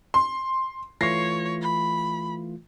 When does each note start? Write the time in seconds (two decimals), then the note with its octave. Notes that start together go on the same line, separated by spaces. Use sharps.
0.14 C6
1.01 E3 A3 F4 C#5 A#6 C7
1.62 B5